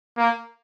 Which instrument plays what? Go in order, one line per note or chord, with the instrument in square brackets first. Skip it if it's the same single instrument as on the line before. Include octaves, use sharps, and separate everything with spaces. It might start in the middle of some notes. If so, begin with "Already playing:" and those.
[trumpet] A#3